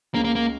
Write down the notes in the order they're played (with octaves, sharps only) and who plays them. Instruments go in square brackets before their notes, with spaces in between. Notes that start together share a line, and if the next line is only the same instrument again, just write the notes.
[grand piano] C#2 C#3 G#3 C#4 [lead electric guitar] A#3
[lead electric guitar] A#3
A#3